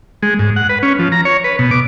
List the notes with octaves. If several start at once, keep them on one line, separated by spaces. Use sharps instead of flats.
G#3
G#2
F#5
B4
C#4
F3
A#5
C#5
B4
B2
D6